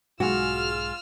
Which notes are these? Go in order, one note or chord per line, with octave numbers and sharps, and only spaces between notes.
B1 G#2 F4 F#4 G#4 E6 F6